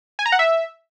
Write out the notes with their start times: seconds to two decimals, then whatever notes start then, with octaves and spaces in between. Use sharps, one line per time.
0.19 G#5
0.26 A#5
0.32 F#5
0.39 E5